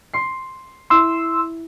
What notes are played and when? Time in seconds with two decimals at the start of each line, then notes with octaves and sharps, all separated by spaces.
0.14 C6 C7
0.90 E4 C6 E6